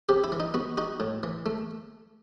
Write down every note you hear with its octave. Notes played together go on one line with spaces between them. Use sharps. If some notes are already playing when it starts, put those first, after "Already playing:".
C3 G4
E4
E3
D#4
B3 F#4
D#4 F#4
A2
E3
A3